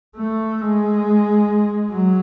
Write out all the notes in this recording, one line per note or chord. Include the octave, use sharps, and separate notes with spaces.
A3
G#3
F#3